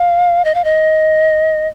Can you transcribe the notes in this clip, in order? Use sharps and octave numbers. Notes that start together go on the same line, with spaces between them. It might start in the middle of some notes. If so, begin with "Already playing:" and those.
Already playing: F5
D#5
F5
D#5